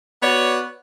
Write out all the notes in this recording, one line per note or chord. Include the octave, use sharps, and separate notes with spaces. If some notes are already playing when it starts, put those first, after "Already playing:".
B3 F#4 C#5 D5